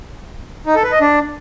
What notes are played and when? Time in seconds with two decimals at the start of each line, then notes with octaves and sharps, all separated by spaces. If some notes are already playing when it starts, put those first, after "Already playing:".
0.66 D#4
0.75 A4
0.83 B4
0.92 D#5
1.01 D4